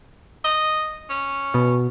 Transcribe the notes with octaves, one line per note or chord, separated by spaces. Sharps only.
D#5
C#4
B2